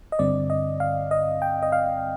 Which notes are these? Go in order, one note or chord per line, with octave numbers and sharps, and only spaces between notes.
D#5
G2 D3 G3 C4 D5
D#5
F5
D#5
G5
D#5
F5